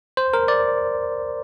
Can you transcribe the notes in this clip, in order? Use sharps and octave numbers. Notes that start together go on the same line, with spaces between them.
C5
A#4
D5